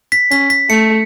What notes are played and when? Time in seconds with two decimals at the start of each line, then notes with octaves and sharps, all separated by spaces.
0.12 B6
0.31 C#4 B6
0.50 B6
0.70 A3 C#7